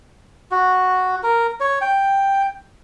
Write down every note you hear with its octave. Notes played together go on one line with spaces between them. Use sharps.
F#4
A#4
C#5
G5